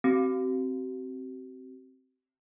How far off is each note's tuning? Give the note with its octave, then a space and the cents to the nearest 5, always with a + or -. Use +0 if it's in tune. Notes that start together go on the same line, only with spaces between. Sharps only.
C4 +0 F#4 +45